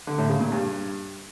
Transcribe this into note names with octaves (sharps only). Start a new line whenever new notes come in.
D3
A2
C#3
A#2
G2